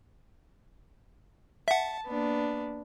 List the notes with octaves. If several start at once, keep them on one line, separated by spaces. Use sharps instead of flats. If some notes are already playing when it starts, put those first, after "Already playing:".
E5 F#5 A5
A#3 B3 D4